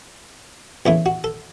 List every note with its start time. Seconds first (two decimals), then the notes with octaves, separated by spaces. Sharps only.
0.86 E2 C#3 E3 A3 E4
1.06 F#4
1.24 A4